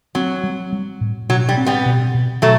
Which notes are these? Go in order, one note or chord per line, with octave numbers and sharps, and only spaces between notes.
F#3 C4
G3
G3
A2
B2 F#3
G3
C4
G3 B3
B2
B2
B2 F#3 A3